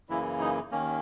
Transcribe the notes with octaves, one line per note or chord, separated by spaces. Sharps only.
F#2 C#3 E3 A#3 E4
D#4
D#2 D#3 A#3 C#4